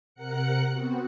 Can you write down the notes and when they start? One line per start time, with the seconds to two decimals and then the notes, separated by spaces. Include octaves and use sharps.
0.15 C3 A#4 F#5 F#6 C#7
0.70 B3 C4 F#4